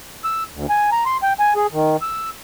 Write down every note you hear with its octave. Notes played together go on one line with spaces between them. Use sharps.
E6
D2
G#5
A#5
C6
G5
G#5
G#4
D#3
E6